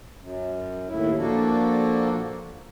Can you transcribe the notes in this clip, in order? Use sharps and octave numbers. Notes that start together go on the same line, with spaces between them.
F#2
D#2 A2 E4
A#2 F3 A#3 D4 F#4 A4